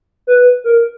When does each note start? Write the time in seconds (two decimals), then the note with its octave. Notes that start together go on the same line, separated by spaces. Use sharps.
0.27 B4
0.64 A#4